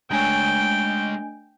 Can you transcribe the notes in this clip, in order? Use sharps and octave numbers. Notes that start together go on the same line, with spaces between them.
G#3 A3 D4 C#5 G5 G#5